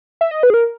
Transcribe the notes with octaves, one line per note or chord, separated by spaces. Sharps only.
E5
D#5
B4
G#4
A#4